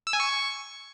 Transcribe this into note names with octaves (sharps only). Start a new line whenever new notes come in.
E6
G#5
C#6